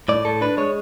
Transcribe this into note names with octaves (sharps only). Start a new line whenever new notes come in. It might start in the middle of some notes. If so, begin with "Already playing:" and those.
A2 D5
A2 A4
D4 B4
G#3 C#5